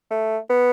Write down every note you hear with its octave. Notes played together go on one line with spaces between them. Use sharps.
A3
B3